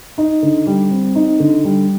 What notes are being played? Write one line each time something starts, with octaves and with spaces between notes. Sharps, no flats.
D#4
D3
G3
C4
D#4
D3
G3